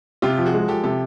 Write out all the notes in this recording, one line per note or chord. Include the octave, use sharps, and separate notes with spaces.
C3 F4 G4
F3
F#4 G#4
G#3
F3 G4 A4
C3 G4 A4